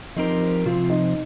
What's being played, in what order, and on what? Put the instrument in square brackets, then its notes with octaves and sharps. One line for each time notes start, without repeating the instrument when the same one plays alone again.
[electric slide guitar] F3 C4 G4 A#4 [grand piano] D#4
[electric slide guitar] C3 F3 C4 [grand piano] F4
[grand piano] D#4